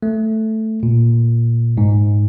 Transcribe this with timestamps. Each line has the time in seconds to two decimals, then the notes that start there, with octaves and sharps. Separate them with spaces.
0.03 A3
0.83 A#2
1.77 G#2